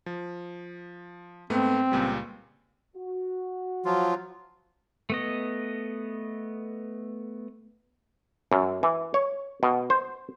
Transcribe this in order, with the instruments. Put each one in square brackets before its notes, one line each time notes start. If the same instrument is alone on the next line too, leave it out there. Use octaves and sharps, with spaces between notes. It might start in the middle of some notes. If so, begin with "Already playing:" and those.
[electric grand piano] F3
[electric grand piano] G#2 A3 B3 [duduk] C4
[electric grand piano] C#2 A#2 G3
[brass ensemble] F#4
[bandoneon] F3 F#3 F4
[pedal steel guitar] A3 B3 D#5
[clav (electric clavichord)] F#2
E3
C#5
B2
C5